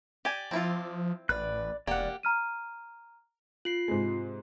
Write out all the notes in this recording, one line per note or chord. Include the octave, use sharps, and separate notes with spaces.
G4 D5 G#5
F3 C4 E4 F4
A1 B4 D5 F#6
E1 A#3 G4 D5 F#5
A#5 F6 D#7
F4 C7 F#7
G#2 C3 G#3